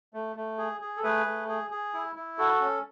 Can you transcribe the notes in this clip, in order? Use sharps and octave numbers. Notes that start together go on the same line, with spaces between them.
A3
A3
G#4
G#4
A4
A3 G#4 B4
A3
G#4
G#4
E4
E4
F#4 A4
C#4